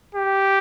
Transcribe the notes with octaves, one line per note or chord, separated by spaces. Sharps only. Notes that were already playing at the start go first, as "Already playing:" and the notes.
G4